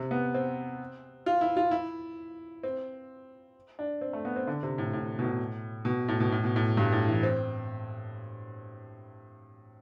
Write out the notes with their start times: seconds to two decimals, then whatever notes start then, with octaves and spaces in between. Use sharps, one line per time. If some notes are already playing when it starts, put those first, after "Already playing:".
Already playing: C3
0.11 B3
0.34 C4
1.26 F4
1.41 E4
1.57 F4
1.71 E4
2.63 C4
3.79 D4
4.01 C4
4.13 A3
4.25 B3
4.36 C4
4.47 D3
4.63 C3
4.78 A2
4.93 A2
5.19 B2
5.24 A2
5.85 B2
6.08 A2
6.20 B2
6.32 A2
6.44 B2
6.56 A2
6.77 G2
6.92 A2
7.08 E3
7.23 C4